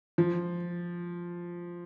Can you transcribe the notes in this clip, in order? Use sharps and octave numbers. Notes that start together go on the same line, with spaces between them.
F3